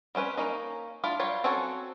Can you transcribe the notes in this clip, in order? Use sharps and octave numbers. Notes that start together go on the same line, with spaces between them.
G3 C4 C#4 B4
A#3 C#4 D#4
D4 E4 F4 D5
F#3 G3 F4 C#5
C4 C#4 F#4 A4 C#5